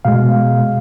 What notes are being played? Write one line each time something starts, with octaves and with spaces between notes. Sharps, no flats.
B2 G#3 F5